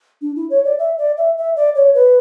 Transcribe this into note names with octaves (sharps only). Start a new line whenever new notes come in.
D4
E4
C#5
D5
E5
D5
E5
E5
D5
C#5
B4